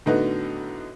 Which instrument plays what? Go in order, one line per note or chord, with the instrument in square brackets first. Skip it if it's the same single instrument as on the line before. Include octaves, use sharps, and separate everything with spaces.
[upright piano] A2 D3 B3 D#4 F#4